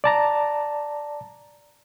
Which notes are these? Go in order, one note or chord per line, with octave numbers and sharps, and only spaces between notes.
D5 A5 A#5